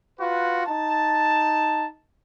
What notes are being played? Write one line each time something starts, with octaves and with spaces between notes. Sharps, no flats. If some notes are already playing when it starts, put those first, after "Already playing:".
F4 F#4 B4
D#4 A5